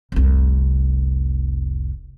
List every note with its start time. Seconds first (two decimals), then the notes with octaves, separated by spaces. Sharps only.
0.12 F1 C2